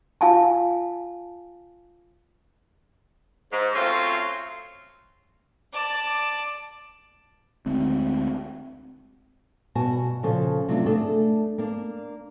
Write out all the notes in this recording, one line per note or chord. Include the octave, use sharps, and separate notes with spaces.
F4 F5 G#5 A5
G#2
F#3 A3 C4 C#4 F4
D5 A5
D2 D3 G#3 C4
G2 B2 F#4 F#5 G#5 A5
A#2 C#3 F3 A4
D2 C3 F#3 A3 D4 F4
A3 D4 G#4 A4
A#3 D4